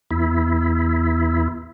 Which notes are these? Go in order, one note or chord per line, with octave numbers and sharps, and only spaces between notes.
E2 E4